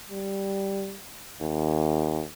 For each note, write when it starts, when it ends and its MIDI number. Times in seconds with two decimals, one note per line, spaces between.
0.10 0.98 55
1.41 2.24 39